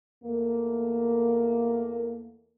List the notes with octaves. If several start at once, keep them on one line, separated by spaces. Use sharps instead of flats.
E2 A3 A#3